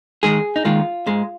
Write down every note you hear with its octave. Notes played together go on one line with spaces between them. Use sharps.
G#2 D#3 G#3 G#4
D#4
D#2 D#3 G#3 F4
G#2 G#3